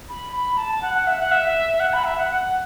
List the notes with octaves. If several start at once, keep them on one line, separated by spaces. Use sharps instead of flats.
B5
B5
A5
F#5
F#5
E5
F#5
E5
F#5
B5
E5
F#5
F#5